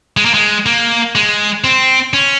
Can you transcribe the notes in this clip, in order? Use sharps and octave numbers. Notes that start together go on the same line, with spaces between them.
G#3
A#3
G#3
A#3
G#3
C4
C#4